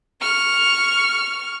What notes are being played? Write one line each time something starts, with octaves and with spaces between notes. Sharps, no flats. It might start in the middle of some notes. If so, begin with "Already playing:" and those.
C#6 F6